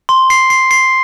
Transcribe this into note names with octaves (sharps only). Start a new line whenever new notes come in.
C6
C7
C7
C7